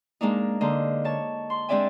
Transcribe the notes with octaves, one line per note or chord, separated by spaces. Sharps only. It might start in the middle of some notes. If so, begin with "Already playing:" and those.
G#3 A#3 D4 D#4
D3 A#3 C5 D#5
C#5 A5
C6
G#3 C4 D4 D5 E5 G#5